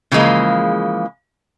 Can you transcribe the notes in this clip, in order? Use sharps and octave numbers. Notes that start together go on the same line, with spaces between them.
C#3 E3 F3 G#3 A#3